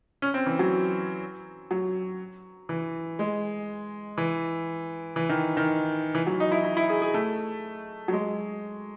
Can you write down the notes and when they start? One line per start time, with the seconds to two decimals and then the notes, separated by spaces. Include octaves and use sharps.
0.22 C#4
0.34 C4
0.46 E3
0.59 F#3
1.71 F#3
2.69 E3
3.19 G#3
4.18 E3
5.16 E3
5.29 D#3
5.57 D#3
6.15 E3
6.27 F#3
6.40 D#4
6.52 E4
6.64 E4
6.77 E4
6.90 G#4
7.02 G#4
7.14 A3
8.08 F#3
8.13 G#3